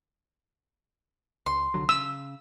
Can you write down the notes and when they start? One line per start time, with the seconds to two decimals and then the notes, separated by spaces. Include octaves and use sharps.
1.46 C#2 C6
1.74 C2 D3 F#3
1.89 C#3 E6